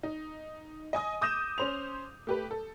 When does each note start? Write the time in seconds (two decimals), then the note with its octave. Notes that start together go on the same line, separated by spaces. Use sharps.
0.03 D#4
0.93 D#5 G#5 D#6
1.21 D6 D#6 G6 A#6 D#7 E7
1.58 C#4 C5 F7
2.27 A3 G4 B4
2.51 A4